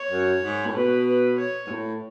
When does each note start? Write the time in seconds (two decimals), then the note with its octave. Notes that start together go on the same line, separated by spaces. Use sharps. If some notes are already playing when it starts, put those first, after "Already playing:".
Already playing: C#5
0.11 F#2
0.42 G#2
0.67 A2
0.75 B2 B4
1.07 B4
1.38 C#5
1.67 G#2
1.71 A2